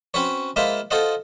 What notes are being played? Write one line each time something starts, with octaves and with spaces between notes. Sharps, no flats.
C4 C#4 F#4 B4 C#5
G#3 A#3 F4 B4 C5 E5
F4 A4 C5 D#5 F#5